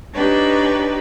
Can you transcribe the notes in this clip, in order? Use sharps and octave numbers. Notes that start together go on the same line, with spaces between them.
D4 D#4 G4 B4 C#5